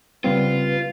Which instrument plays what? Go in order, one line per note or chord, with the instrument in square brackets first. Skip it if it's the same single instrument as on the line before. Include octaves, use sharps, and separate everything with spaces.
[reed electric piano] C#3 B3 C4 [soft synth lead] G3 [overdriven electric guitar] F4 [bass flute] B4